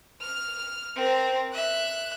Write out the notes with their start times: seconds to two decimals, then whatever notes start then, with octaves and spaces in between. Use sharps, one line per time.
0.21 F6
0.96 C4 A#4
1.53 E5 F#6